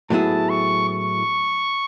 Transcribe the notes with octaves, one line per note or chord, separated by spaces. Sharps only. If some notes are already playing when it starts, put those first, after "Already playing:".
A2 F#3 B3 E4 G#4 A5
C#6
C#6